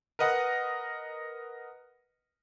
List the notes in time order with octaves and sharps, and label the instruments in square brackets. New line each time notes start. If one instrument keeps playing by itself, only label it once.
[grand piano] A#4 B4 D#5 F#5